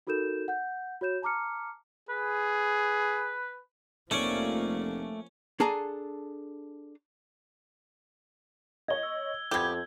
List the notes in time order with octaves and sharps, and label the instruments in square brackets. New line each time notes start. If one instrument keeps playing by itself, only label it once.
[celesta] D#4 F#4 A4 A#4 G6 E7
F#5 G6
F#4 C#5 G6 E7
A5 A#5 D6 F6 C#7
[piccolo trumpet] G#4 [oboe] B4
[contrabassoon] F1 [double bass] F3 A#3 [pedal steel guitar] A3 D5 [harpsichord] C#4
[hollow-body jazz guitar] D4 G#4 A4 G#5 A#5
[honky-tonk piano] C#5 D#5 [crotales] G#6 G7
[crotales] E6
[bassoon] F2 [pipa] B3 G4 [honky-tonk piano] G6 G#6